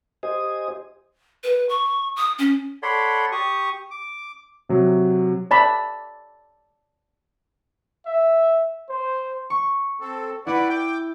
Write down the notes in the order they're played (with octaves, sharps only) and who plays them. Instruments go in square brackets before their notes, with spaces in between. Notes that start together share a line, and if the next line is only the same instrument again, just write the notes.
[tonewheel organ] G4 C5 D#5 G#5 D#6
[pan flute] B4
C#6
D#6
C#4
[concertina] A4 C#5 D5 F#5 B5 C6
G4 C#6 D#6
D6
[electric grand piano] C3 F#3
[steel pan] D5 A5 B5
[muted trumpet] E5
C5
[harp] C#6
[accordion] C4 A4
[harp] E4 [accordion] B4 D5 F#5
[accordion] G5 D6